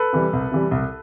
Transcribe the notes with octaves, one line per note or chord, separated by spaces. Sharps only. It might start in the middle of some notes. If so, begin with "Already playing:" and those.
Already playing: A4 B4
C3 E3 G3
C2
C3 E3 G3
C2